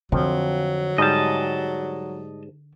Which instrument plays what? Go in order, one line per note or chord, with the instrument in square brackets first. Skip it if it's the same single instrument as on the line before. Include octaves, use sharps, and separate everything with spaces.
[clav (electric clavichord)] F2 F3 [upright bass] D3 [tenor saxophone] F#3
[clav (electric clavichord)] G#2 G3 [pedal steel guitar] D#5 A5